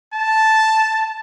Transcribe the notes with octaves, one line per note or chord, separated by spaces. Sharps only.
A5